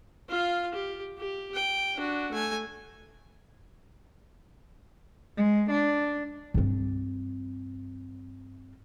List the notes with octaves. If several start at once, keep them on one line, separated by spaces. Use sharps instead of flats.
F4 F5
G4
G4
G5
D4 F#4
A3 G#5
G#3
D4
G2 C4